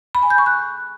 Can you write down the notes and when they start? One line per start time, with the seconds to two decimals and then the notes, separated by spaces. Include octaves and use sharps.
0.15 B5
0.23 G#5
0.30 G6
0.38 C#6
0.46 F#6